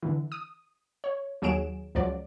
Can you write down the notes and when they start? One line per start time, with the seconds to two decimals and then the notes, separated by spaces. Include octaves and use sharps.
0.03 D3 E3
0.32 D#6
1.04 C#5
1.42 D#2 F#3 G#4 D7 E7
1.95 C#2 F3 F#3 D5